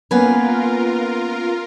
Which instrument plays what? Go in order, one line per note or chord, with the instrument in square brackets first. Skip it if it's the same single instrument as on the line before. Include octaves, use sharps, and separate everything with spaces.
[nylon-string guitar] A#3 B3 C#4 [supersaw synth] F4 A#4 [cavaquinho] B4 G#5